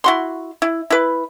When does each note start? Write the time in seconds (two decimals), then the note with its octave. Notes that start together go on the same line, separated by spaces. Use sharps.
0.04 E4 F#4 C6
0.62 E4
0.90 E4 B4